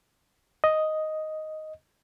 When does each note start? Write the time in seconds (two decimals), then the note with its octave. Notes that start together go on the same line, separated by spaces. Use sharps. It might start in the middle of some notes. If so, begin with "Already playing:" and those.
0.64 D#5